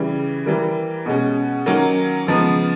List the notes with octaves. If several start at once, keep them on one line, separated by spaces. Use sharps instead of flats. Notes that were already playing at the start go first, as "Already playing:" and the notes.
Already playing: C#3 E3 G3
E3 G3 A#3
B2 G#3 C#4
D#3 F#3 A#3 C#4
C#3 F3 G#3 B3